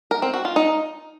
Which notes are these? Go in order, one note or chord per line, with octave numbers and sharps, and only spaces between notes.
A#4
C4
F#4
F4
D#4